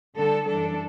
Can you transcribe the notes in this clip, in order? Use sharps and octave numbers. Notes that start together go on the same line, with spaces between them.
D3 G3 D4 A4
F#2 E3 G3 D4 A4